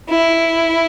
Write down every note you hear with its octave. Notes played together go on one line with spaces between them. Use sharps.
E4